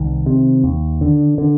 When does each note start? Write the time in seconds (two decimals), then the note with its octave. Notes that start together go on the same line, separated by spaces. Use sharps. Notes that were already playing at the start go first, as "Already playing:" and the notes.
Already playing: C2 D#3
0.26 C3
0.64 D#2
1.01 D3
1.38 D3